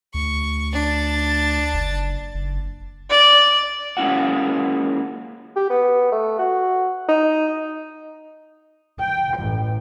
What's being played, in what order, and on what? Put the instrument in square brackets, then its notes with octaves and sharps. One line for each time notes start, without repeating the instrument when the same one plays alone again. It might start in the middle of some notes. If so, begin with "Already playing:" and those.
[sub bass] D2 [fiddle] C#6
[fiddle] D4 A5
[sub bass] F#1
F#1
[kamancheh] D5
[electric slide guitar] G#3 A#3 C#4 E4 F#4 F#5
[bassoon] G4
B3
A3
F#4
D#4
[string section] G5
A1